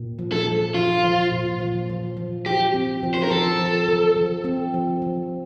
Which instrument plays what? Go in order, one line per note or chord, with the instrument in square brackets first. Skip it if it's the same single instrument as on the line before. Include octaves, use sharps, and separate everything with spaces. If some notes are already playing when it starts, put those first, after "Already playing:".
Already playing: [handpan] A#2
F3
[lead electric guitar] A4
[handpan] F3
[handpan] F3 [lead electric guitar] F4
[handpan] F3
A#2
F3
F3
F3
[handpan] F3 [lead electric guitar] G4
[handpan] C4
F3
[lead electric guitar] C5
A#4
[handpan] F3 [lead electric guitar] A4
[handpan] F3
F3
F3
C4
F3
F3